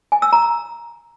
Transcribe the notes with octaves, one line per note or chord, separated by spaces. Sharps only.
G#5
E6
A#5